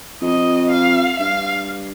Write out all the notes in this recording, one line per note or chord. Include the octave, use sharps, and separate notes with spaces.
F2 D#5
F5
G2 F5